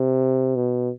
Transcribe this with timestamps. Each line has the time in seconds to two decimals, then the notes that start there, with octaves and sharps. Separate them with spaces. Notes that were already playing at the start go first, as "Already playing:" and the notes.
Already playing: C3
0.56 B2